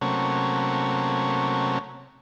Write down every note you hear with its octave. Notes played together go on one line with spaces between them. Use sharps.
C3 F#3 A3 A#3 C#4